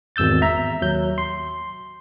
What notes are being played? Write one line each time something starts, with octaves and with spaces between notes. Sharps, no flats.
G#1 E2 E6 G6 A6
E5 A#5
D#2 F#3 G6
C6